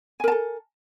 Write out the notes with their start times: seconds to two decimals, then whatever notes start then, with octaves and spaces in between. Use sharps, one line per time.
0.20 G#5
0.24 A#4
0.28 A5
0.32 A4